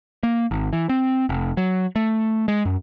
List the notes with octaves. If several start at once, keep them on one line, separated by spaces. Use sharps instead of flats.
A#3
G#1
E3
C4
F1
F#3
A3
G#3
F#2